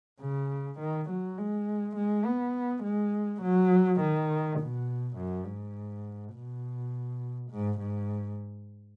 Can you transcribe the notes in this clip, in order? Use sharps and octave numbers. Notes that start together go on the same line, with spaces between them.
C#3
D#3
F#3
G#3
G#3
B3
G#3
F#3
D#3
B2
F#2
G#2
B2
G#2
G#2